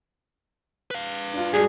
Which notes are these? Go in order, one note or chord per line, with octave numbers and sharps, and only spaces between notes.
B4 F5
D4 F4
G2 G#3 F#4 G#4 D5